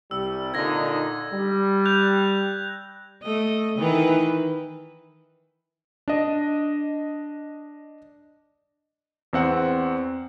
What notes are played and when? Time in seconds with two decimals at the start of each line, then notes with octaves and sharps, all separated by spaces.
0.11 C2 G3 E6
0.54 A#2 D3 D#4 G#6 A#6
1.33 G3
1.86 F#6 G6 F7
3.23 A3 D#5
3.78 D#3 E3 B4
6.08 D4 D#5
9.33 E2 C4 F#5